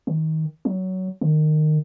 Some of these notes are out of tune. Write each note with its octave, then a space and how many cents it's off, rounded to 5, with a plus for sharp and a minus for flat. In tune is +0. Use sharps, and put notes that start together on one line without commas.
D#3 +25
F#3 +15
D#3 -20